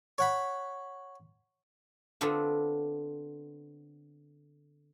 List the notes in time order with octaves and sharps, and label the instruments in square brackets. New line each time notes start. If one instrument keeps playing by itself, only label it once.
[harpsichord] C#5 F#5 B5
[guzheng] D3 B3 C4 D4 F4